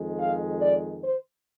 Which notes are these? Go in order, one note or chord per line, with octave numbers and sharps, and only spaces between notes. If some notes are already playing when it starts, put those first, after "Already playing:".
Already playing: F2 D#3 G#3
F5
D5
C5